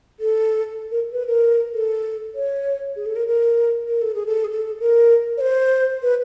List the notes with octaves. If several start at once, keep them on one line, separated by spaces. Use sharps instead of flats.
A4
A#4
B4
A#4
A4
C#5
G#4
A4
A#4
A#4
A#4
A4
G#4
A4
G#4
A4
A#4
C#5
C5
B4